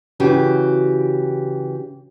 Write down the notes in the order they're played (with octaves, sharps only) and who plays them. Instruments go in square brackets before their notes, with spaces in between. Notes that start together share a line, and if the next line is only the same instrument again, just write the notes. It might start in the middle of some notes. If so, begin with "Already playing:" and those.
[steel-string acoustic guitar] C#3 E3 F#4 G4